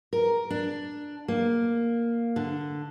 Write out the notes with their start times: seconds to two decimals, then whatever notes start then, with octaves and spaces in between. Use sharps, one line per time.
0.13 A#4
0.50 D4
1.28 A#3
2.36 D3